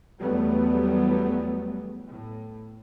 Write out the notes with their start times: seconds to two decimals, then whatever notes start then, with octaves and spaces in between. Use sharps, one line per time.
0.18 E2 F#3 G3 A3 B3
2.10 A2